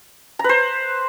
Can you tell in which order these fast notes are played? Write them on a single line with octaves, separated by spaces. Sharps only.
A#5 B4 C5